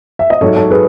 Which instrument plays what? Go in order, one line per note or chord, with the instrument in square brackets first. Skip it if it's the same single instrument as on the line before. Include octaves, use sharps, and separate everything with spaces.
[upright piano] E5
D#5
G#2 F#3 A4 C#5
A4 C#5
G#4 B4